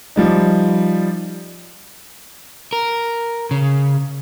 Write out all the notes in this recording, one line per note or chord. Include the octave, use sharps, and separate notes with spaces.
F3 G3 D#4
A#4
C#3